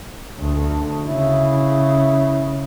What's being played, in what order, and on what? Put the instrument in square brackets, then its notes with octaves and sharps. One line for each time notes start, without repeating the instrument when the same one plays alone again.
[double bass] D2
[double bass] C#3 [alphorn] E4